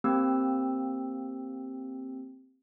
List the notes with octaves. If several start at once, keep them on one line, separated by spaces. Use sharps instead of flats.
A#3 C4 G4 E6